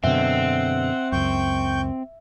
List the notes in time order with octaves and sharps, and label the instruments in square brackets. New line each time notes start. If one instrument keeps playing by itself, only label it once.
[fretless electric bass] F#2 B2 D3 [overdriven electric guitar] C4 [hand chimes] E5 [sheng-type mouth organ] F#5
[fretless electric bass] C#2 F#2 [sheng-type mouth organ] G5 C#6 G6